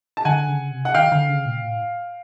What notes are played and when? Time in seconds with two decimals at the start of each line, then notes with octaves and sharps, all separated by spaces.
0.17 A5
0.25 D3 F#5 G#5
0.48 C#3
0.71 C3
0.85 F#5
0.94 D#3 F5 G5
1.12 D3
1.29 C#3
1.45 A#2
1.63 A2